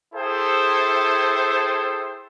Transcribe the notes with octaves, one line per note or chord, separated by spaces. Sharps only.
E4 G#4 A4 C5 E5 G5